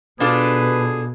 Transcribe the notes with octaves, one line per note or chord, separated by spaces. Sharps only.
B2 D4 F4 G#4 A4 B4